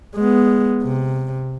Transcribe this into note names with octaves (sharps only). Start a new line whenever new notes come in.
G#3 B3
C3